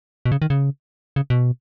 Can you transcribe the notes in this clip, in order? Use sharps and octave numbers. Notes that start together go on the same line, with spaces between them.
B2
C#3
D#3
C#3
C#3
B2